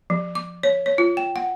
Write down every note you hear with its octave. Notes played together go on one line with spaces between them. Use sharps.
F3
D6
C#5
C#5
F4
G5
F#5